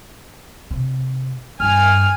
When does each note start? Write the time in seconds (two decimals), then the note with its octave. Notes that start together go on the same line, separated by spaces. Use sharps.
0.71 C3
1.60 G2 G#5 F6